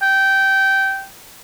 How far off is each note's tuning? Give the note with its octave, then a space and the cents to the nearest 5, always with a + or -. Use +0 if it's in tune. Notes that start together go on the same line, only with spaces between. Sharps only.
G5 -15